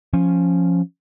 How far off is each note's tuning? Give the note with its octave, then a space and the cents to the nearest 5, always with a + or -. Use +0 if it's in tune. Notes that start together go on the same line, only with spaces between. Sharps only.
F3 +0 C#4 +0